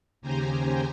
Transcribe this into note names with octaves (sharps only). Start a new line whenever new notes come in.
D#2 C#3 G4 C5 G#5 A#5